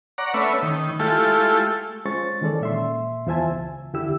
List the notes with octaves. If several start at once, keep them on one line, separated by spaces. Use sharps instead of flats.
C#5 D5 F#5 A#5
A3 C#4 B4 C#5 E5
D#3
G#3 A3 E4 F4 G4 A4
G#3 C#4 F4 C5 C#6 A6
D#3 E3 G#3 C#4 A4 D5
A#2 E5 C6
E2 F4 C5 E5 G#5 A5
C#2
E2 D3 E4 G4 E6